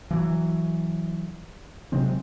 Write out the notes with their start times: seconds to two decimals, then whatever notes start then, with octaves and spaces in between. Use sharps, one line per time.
0.11 E3 F#3
1.92 C3 F#3 G#3 C4